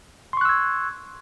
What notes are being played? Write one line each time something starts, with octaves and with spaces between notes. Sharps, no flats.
C6 C#6 E6 F#6 G#6